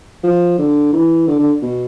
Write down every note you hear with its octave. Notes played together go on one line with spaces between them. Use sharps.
F3
D3
E3
D3
D3
B2